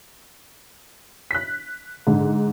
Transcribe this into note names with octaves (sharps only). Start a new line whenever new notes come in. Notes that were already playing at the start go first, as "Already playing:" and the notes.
F#6 B6
G#2 D3